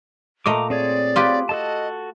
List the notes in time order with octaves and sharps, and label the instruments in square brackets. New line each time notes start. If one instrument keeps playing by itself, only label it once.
[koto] A#2 A3 D#5 [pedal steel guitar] A#5 D6
[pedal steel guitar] C4 G#4 C#5 [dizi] D5
[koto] F4 G4 B4
[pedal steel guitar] F#4 A4 A5 [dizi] D#5